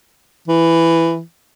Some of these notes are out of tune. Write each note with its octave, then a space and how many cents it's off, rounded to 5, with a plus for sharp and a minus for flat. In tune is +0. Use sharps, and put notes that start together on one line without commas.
E3 +10